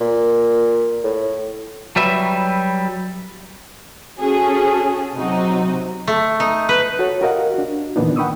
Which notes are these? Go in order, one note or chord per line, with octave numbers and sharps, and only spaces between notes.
A#2
A2
F#3 G3 B4 E5
C#4 F#4 G#4 A4
C3 F#3 C4 D#4 F#4
A3
D#4
B4
F#4 A4 C#5
F#4 G4 A#4 D#5 F5 F#5
D4 F#4
A#2 D#3 E3 B3 D4 D#4
F#5 G5 B5 C#6 D#6 E6